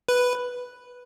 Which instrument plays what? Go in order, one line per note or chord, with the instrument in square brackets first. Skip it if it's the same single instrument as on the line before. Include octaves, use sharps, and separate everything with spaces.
[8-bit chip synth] B4